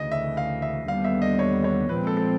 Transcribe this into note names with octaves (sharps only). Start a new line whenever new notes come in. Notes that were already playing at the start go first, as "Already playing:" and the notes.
Already playing: D2 C#3 E3 D#5
E5
F5
E5
D#2 D3 G3 B3 F5
E5
D#5
C#5
C#5
A#2 F3 G#3 C4 B4
A4
A4